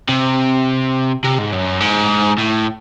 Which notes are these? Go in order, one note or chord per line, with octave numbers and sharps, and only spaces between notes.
C3
C3
G#2
F#2
G#2
A2